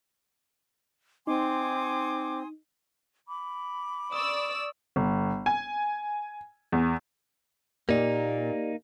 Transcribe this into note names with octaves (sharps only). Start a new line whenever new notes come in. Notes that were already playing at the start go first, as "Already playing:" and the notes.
C4 D#4 G#5 C6 D6 D#6
B5 D6
D5 C#6 D#6 E6
G1
G#5
E2
A#2 A#3 D#4 G4 D5